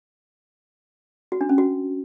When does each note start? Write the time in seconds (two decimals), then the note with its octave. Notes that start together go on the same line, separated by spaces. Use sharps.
1.32 F#4
1.41 D4
1.49 C#4
1.58 F#4